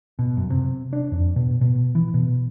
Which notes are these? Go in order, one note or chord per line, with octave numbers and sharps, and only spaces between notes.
B2
F#2
C3
D4
F2
B2
B2
E3
B2